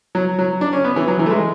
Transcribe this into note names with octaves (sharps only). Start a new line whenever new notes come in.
F#3
F#3
D4
C#4
B3
E3
F#3
E3
A3
G#3